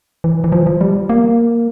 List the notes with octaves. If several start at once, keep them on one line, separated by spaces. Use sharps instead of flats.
E3
E3
F3
F3
G3
A#3